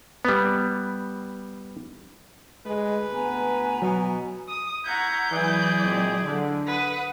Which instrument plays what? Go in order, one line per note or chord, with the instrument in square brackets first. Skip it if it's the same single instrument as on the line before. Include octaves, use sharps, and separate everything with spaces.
[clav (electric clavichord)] G3 B3
[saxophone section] D2 B4 [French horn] G#3
[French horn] B3 [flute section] G#5 A#5
[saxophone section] B2 [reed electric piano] F#3
[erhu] D#6
[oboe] E4 [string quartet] F#5 A#5 C#6 [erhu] G6
[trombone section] E3 [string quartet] F#3 E4 D5 [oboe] G#4
[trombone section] A#2 G#3 C4
D3
[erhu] B4 [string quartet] F#5 D#6